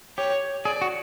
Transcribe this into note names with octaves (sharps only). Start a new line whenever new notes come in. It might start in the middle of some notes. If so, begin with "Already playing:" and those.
G4 C#5
G#4 D5
F#4